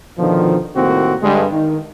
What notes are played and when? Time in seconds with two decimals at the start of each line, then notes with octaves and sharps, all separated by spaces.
0.18 B2 D3 D#3 F3
0.76 C2 A2 D#3 A#3 C4 F#4
1.23 G2 D3 G#3
1.52 D#3